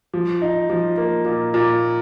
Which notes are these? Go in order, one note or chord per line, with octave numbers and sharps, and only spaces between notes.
F3
D#4
F3
A#3
A#2
A#2